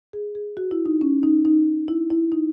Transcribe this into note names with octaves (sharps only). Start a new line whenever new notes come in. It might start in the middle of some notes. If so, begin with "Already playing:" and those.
G#4
G#4
F#4
E4
D#4
C#4
D#4
D#4
E4
E4
D#4